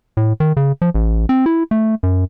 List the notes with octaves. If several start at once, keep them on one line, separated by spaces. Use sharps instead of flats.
A2
D#3
C#3
F3
A1
C4
E4
A3
F#2